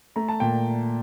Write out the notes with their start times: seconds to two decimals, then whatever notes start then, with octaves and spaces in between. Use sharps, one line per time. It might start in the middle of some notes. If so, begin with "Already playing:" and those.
0.16 A3 A#5
0.28 A5
0.40 A#2 G5